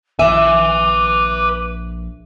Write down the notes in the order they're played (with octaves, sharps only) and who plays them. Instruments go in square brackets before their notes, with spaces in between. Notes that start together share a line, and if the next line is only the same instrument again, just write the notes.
[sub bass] A#1 [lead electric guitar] B4 G#5 [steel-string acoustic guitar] E5 [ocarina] D6